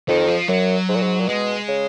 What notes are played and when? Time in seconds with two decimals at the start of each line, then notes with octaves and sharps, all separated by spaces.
0.08 F2 D#3
0.28 F3
0.48 F#2 F#3
0.89 G#2
0.95 A#2
1.02 G#2
1.20 A#2
1.28 B2 G#3
1.68 C#3